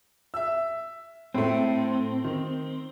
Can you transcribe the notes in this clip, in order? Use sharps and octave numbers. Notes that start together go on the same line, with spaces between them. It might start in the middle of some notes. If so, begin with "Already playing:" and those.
E5 E6
A2 A3 C4
D#3